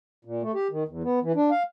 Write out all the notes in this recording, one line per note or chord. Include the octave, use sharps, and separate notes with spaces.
A#2
A3
G4
D#3
E2
B3
E3
D4
F5